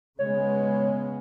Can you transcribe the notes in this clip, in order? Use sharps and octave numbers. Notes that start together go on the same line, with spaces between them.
C#3 G#3 B3 C#5